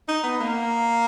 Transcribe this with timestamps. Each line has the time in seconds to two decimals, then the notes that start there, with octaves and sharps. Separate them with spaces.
0.08 D#4
0.24 B3
0.40 A#3